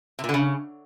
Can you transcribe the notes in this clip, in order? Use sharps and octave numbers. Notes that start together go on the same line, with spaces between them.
C3
A#2
D3
C#3